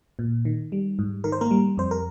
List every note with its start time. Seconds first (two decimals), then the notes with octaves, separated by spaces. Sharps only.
0.19 A#2
0.45 D#3
0.72 G3
0.99 G#2
1.24 D#3 A#4
1.32 C5
1.41 A#3 A#4
1.51 G3
1.77 F2 C5
1.91 A#4